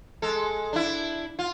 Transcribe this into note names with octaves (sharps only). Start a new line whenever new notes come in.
G#3 A4
D4 E4
F4